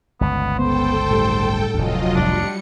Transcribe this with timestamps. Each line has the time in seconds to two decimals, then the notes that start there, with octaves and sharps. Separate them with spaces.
0.21 G1 C#2 B3
0.59 B3 A4 C5 G5
1.11 A2 G3
1.74 F1 D2 F#3 F4 D#5
2.15 C2 F2 A2 G3 D4 C#7